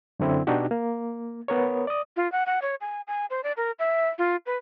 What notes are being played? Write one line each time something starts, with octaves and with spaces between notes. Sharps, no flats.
F#2 D3 C4 E4
B2 D4 D#4 F#4 G4
A#3
B3 A#4 C#5
D5 D#6
F4
F#5
F#5
C#5
G#5
G#5
C5
D5
A#4
E5
F4
B4